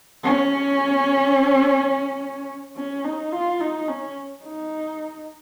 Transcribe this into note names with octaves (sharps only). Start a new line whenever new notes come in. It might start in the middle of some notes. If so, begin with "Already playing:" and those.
C#4
C#4
D#4
F4
D#4
C#4
D#4